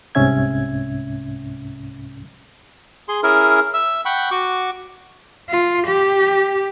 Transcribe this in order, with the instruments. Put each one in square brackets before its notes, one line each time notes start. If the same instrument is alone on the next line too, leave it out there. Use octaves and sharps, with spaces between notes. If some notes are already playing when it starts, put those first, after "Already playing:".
[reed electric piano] C2 G#2 C3 C#4 E5 G#6
[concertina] G#4 C6
C#4 E4 G#4 A#4
E5 E6
F#5 G5 B5 C#6
F#4 C#6 D6
[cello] F4
G4